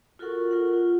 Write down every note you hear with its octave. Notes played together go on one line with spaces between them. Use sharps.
F4 F#4 A4 A#4 F#5 C#6
F4 A#4 F#5
F4